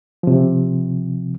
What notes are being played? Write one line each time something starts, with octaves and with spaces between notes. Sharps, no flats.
C3 F3